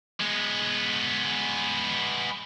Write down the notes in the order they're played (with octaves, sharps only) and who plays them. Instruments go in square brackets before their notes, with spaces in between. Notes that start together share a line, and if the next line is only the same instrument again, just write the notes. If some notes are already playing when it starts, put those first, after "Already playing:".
[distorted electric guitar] G#3 B3